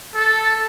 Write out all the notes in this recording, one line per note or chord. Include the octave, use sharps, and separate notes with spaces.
A4